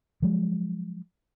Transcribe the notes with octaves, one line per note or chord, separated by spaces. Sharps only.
F3 F#3 G#3